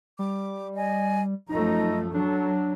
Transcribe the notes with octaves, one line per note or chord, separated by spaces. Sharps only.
G3 D6
D5 D#5 G#5
F#2 F3 A3 D#4 D#5 A#5
F#3 D4 A4